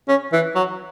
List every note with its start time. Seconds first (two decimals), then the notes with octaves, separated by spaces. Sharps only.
0.08 C#4
0.33 E3
0.55 F#3